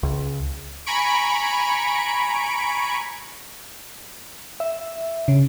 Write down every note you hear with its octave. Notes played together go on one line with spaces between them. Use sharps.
C#2
G#5 A#5 B5 C#6 D7
E5
C#3